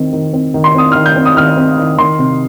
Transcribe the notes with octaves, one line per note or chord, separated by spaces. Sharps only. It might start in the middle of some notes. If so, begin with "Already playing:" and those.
Already playing: D#3 C4
D#3
C4
D#3
C6
C4 D#6
D#3 F6
G6
C4
D#6
D#3 F6
C4
D#3
D#3 C6
C3